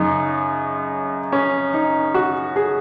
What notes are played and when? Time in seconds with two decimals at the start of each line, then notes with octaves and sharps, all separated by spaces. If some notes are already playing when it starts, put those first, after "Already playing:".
Already playing: F#2 C#3 D#4
1.32 C#4
1.74 D#4
2.14 F#4
2.56 G#4